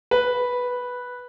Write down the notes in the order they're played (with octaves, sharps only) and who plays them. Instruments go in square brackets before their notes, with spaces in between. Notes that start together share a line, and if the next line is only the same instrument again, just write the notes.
[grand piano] B4